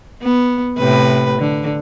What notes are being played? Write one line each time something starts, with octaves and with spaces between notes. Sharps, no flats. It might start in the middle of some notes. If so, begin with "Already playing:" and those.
B3
A2 C3 B4
D3